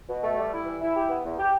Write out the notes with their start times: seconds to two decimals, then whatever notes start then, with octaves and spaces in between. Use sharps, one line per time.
0.09 B2
0.23 A3
0.38 G3
0.52 E4
0.66 E3
0.81 E4
0.96 G4
1.09 B3
1.25 E2
1.39 G4